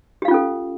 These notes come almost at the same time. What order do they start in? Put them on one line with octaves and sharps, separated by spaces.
G4 F5 F4 C#4 A4